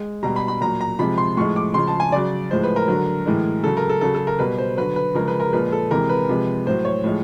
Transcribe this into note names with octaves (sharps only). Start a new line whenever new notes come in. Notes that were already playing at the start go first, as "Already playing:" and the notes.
Already playing: G#3
B2 G3 A#5
B5
B5
A#2 F#3 A#5
A#5
C3 F3 G#3 B5
C6
A2 F3 G#3 C#6
D6
C#3 F3 G#3 C6
A5
G#5
C#3 F#3 D5
A2 F3 G#3 C5
B4
A#4
D3 F#3
A2 E3 G#3
C#3 F#3 A4
A#4
A4
C#3 F#3 A4
A4
A#4
B2 G3 B4
C5
D3 F#3 B4
B4
C#3 F3 G#3 A#4
B4
A#4
A#2 F3 G#3 B4
A4
C3 E3 G#3 A#4
B4
C3 F3 G#3
A2 F#3 C5
C#5
A2 F3 G#3